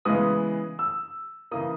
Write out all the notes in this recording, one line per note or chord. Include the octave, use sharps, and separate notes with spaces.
C#3 E3 G#3 B3 D#6
E6
C#3 E3 A#3 D#6